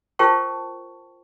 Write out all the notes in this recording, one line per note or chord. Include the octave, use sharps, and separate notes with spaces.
F4 A#4 C5 G5 A5 C#6